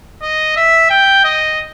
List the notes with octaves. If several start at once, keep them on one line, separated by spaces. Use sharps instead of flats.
D#5
E5
G5
D#5